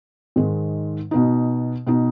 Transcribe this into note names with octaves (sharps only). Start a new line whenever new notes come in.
G#2 D#3 G#3
B2 B3 D#4
B2 B3 D#4